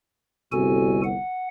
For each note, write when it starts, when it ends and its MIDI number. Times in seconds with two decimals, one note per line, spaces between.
0.52 1.15 31
0.52 1.15 36
0.52 1.01 66
0.52 1.01 69
0.52 1.01 80
1.03 1.48 78